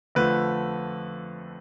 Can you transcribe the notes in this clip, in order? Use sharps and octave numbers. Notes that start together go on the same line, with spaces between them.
F2 D3 F3 A3 B4